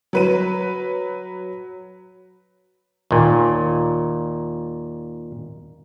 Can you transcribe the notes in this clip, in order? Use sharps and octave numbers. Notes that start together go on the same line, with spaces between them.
F#3 B4 D#7
D#2 A#2